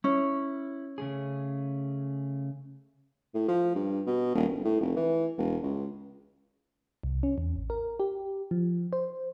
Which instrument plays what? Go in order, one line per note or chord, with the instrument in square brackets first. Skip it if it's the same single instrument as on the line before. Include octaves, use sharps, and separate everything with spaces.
[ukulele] C#4 [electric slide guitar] E4
[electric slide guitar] C#3 A3 G#4
[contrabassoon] A2
F3
G2
B2
D#1
G1
A2
F1
E3
E1
C#2
[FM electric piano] C2
C#4
E2
A1
A#4
G4
F3
C5